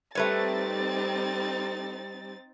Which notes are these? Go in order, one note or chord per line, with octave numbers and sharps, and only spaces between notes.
G3 A3 C4 D#4 B4 C#5 A6